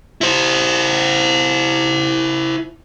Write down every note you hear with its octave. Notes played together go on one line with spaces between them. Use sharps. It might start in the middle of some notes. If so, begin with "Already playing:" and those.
E4 C5